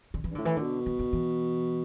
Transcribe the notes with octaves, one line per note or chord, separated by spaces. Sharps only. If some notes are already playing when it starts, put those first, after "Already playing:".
D3
E3
G2
A2 D3
E3
D3
B2
E3
D3
E3